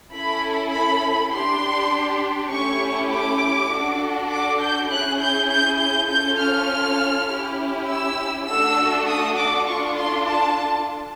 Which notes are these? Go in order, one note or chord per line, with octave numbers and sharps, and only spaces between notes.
C#4 E4 A4 B5
B5
D4 G4 C6
A3 C#4 E4 G4 C#6
D6
D4 F#4 A4
D6
G6
C#4 E4 G#4 F#6
G6
G6
G6
C#4 F4 A4 G6
F6
C#4 E4 G4
E6
A3 D4 F#4 A4 E6
D#6
D6
D4 F4 A4 C#6
C6
A5